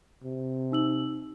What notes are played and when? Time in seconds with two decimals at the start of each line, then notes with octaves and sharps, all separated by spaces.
0.23 C3
0.72 D#4 E6 F#7